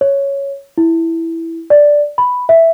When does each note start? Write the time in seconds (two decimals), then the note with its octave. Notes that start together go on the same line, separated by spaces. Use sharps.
0.01 C#5
0.78 E4
1.70 D5
2.18 B5
2.49 E5